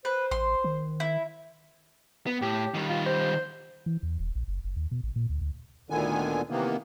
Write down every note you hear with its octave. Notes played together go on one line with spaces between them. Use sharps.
B4 C5
A1 C6
D#3
E4
B3
A2 G4
D#3 G3
F4
C5
E3
E2
E1
A#1
F#1
F#1
D#2
B2
A1
A#2
D2
D2
D2 A#2 D3 D#3 B3 G#5
C3 D#3 E3 A#3 B3